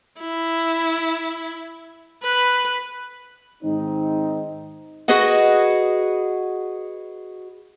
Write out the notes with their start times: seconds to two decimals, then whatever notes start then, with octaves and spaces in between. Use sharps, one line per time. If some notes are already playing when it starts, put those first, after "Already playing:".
0.20 E4
2.23 B4
3.63 G#2 D#3 G#3 C4 D#4
5.08 F#4 G#4 B4 D#5 F#5